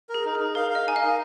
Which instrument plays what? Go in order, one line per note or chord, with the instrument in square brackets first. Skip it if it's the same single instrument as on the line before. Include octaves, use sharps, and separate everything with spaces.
[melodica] A#4
[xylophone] G#4
[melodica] D#4
[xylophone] G#4
[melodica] D#4
[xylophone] A#4 [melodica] F5
[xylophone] D#5 [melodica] F5
[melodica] D#4 [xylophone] G#5
[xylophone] F5
[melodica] A#4